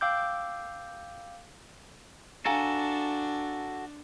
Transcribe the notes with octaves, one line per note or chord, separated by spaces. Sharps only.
F5 G5 D6 E6 G6
D4 F#4 A4 F5 G#5 A#5